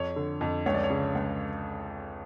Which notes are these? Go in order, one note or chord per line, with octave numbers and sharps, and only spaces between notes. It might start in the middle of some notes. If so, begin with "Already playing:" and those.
Already playing: F2 C#5
D3
F2
C#2 C#5
D5
C#5
C#3
C#2